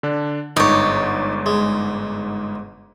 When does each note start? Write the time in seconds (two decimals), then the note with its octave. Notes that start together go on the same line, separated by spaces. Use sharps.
0.03 D3 D4
0.56 G1 G#2 D#4 C#5 D5
1.46 G#3